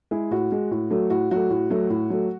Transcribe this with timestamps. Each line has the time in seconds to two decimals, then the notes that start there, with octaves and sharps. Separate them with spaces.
0.11 G#3 E4 G#4
0.31 A2 F#4
0.52 G#3
0.71 A2
0.90 F#3 A3
1.10 A2 F#4
1.31 F#3 A3 F#4
1.50 A2
1.70 F#3 A3
1.90 A2
2.10 F#3 A3